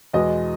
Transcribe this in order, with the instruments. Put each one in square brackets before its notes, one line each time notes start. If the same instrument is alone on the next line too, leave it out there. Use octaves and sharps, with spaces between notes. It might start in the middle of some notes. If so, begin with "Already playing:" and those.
[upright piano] E2 B2 G#3 D#5